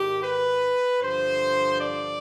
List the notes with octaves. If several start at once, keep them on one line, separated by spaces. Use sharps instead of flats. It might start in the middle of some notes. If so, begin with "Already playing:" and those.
Already playing: G#2 D#3 G4
B4
G2 D3 F3 C5
D5